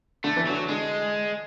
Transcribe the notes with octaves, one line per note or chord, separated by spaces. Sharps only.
D3 A3
E3
D3 F#3
D3 G#3